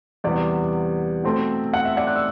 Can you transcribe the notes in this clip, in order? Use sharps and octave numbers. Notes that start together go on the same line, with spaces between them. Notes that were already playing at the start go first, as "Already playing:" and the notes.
E2 C3 G3 B3 D5
B2 A3 C4
F#5
E5
D5 F#5
F#6
E6